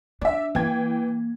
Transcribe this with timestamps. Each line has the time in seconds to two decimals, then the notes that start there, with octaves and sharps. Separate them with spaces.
0.21 D4 D5 E5
0.55 E3 A#3 G5 G#6